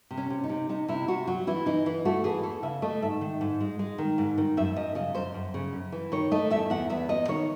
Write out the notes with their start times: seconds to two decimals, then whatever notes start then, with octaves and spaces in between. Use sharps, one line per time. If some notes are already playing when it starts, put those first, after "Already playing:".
0.11 C3
0.17 C#4
0.30 C3
0.44 D#4
0.49 C3
0.69 C3 D#4
0.88 C3 E4
1.08 C3 F#4
1.27 F#3 F#4
1.47 E3 E4
1.66 E3 D#4
1.86 E3
2.05 A3 F#4
2.24 E3 G#4
2.43 E2 A4
2.63 C#3 E5
2.82 A3 D#5
3.02 G#2 E5
3.21 D#3
3.41 G#2
3.60 G#3
3.79 G#3
3.98 D#3
4.18 G#2
4.38 D#3
4.57 F#2 E5
4.76 F#2 D#5
4.95 C#3 D#5
5.15 F#2 C5
5.34 F#2
5.54 C#3
5.73 F#2
5.92 E3
6.12 D#3 C#5
6.31 A3 D#5
6.51 E2 E5
6.70 E2 F#5
6.90 E2 E5
7.09 E2 D#5
7.28 D#3 C#5